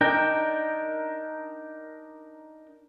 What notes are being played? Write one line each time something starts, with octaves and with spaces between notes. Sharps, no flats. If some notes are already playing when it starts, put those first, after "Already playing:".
D4 D#4 A#4 G5